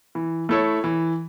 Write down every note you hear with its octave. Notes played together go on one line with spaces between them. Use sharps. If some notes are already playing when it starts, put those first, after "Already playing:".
E3
A3 E4 A4 C#5
E3